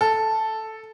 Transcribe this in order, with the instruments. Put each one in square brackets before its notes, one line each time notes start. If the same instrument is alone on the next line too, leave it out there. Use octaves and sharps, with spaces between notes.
[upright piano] A4